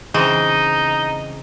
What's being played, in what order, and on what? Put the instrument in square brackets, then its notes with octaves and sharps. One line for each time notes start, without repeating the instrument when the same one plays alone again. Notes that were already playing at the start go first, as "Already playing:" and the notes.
[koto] C#3 E3 C4 [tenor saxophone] D#4